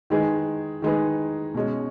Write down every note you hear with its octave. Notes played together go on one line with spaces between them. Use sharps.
D#3 G#3 D#4 G#4 B4
D#3 G#3 D#4 G#4 B4
B2 G#3 C#4